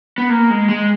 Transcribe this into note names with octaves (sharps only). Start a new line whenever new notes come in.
B3
A#3
G#3
G#3